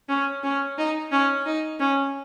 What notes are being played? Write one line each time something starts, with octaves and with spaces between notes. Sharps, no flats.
C#4
C#4
D#4
C#4
D#4
C#4